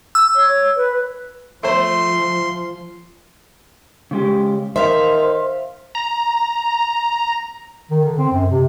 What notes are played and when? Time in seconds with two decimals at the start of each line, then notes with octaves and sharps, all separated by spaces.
0.15 E6
0.35 C#5
0.77 B4
1.63 F3 A3 C5 C6
4.11 C#3 G#3 G4
4.76 D#3 C5 E5 F5
5.95 A#5
7.91 D#3
8.04 D3
8.19 C4
8.33 F#2
8.50 C3